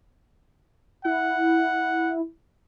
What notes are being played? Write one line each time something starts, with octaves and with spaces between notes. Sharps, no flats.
E4 F#5